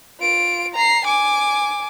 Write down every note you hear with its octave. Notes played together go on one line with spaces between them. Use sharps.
F4 D7
A#5 C7
G#5 D6